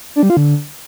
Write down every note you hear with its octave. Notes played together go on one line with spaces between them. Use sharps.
D4
G3
F4
D3